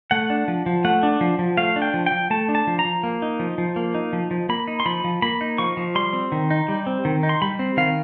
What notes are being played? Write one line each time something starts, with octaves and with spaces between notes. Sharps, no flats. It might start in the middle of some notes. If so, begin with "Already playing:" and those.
A3 F#5
D4
F3
F3
A3 F#5
D4
F3
F3
A3 F5
D4
G5
F3
G5
F3
A3 A5
D4
A5
F3
A#5
F3
A#3
D#4
F3
F3
A#3
D#4
F3
F3
A#3 B5
D#4
C6
F3 B5
F3
A#3 B5
D#4
F3 C#6
F3
G3 C6
C4
D#3
D#4
G3
C4
D#3
D#4
C6
G3 B5
C4
D#3 F5